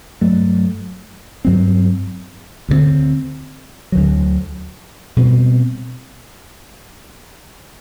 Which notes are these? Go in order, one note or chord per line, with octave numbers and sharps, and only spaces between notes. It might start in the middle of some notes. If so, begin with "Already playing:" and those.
G2 F#3 A3
G2 F#3 C4
D2 D3 G3 C4
D2 D3 F#3
B2 G3 C4